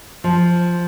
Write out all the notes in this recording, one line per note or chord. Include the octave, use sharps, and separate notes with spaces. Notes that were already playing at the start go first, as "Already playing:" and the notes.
F3